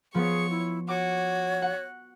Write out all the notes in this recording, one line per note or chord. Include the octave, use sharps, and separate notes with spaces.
F3 B3 G#4 C#5 C#6
E4
F#4 C#5 D6
F#5